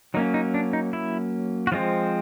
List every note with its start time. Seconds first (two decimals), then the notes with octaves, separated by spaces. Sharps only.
0.14 F#3 A#3 C#4 D#4
0.34 D#4
0.54 D4
0.73 D#4
0.93 E4
1.67 F#4
1.72 F3 G#3 C4 F4